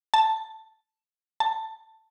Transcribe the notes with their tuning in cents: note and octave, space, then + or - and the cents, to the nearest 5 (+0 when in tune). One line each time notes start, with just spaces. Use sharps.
A5 +0
A5 +10